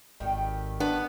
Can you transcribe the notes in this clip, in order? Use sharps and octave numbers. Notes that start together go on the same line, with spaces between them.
G#1 D#3 G3 A3
B3 D4